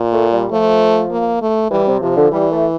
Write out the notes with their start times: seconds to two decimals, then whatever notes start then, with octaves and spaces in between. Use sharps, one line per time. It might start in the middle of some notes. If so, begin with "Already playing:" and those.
Already playing: A#2
0.12 A3
0.32 G3
0.51 F3 A3
1.11 A#3
1.42 A3
1.71 E3 G3
1.87 C3
2.02 C3 F3
2.16 D3
2.31 E3 G3
2.51 A3